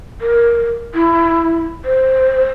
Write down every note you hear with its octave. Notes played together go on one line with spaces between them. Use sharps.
A#4
E4
C5